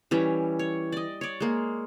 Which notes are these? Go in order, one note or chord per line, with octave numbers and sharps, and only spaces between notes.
E3 G3 C#4
C#5
D5 D#5
C#5 D5
G#3 A#3